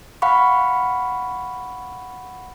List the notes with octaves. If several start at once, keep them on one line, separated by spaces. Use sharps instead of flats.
F5 F#5 B5 C#6